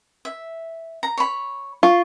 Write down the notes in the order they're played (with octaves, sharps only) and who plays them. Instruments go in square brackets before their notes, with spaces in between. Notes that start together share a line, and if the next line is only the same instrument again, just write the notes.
[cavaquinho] E5
A#5
C#5 B5
[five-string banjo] F4 [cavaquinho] C#6